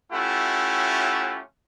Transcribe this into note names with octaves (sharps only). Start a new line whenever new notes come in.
A3 C#4 E4 F4 G4 F#5